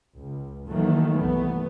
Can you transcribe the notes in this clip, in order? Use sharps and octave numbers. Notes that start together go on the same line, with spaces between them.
C#2
D#3 E3 F#3 A3 A#3
C2 A3 B3